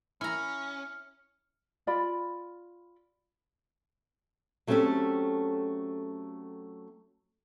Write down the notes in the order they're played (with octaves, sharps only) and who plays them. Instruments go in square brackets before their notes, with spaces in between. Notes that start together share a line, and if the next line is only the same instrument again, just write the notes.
[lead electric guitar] C#4 [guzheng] E4 A#5 [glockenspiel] F6 C#7
[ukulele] F4 D5 B5
[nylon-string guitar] F#3 A3 C4 C#4 G4 A4